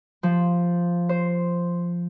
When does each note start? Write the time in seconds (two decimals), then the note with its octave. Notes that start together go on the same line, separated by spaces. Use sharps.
0.23 F3
1.09 C5